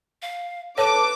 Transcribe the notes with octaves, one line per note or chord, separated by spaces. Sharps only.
F5
A4 B4 C#5 D6